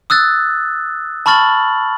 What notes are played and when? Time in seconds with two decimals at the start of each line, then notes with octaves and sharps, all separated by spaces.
0.10 D#6 E6 F#6 A6
1.26 A5 B5 C#6 F6 A6 F#7